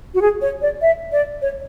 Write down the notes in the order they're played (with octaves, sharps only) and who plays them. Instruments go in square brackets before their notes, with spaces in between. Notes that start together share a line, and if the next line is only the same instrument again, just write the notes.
[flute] F#4
G#4
C#5
D5
E5
D5
C#5